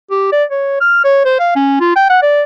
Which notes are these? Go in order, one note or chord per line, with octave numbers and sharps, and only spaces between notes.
G4
D5
C#5
F6
C#5
C5
F5
C#4
F4
G5
F#5
D5